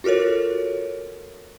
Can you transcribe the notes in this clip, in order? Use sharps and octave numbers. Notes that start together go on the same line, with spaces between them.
F4 F#4 A4 A#4 C#5